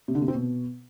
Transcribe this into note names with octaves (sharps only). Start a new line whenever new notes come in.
C3
D3
C3
C4
B2